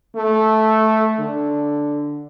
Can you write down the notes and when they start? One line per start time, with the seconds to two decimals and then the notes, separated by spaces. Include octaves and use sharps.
0.15 A3
1.19 D3